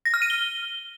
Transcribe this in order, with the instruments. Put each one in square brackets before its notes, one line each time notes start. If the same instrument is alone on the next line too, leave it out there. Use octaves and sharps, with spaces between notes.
[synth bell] A#6
F6
D#7
G7